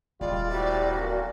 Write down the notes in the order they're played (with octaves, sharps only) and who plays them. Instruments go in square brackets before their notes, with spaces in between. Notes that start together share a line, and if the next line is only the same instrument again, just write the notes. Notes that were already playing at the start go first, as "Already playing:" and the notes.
[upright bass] D#1 [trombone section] G3 G#3 F4 [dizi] D5
[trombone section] A2 C3 G3 [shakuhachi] F#4
[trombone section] B1 A#2